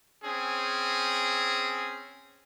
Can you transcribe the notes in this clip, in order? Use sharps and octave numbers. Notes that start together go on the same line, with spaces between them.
C4 C#4 G#4